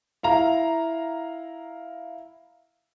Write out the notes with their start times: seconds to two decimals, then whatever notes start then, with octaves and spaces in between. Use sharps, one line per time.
0.23 E4 F5 A#5